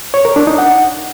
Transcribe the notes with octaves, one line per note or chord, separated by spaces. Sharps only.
C#5
A#4
D4
D#4
F#5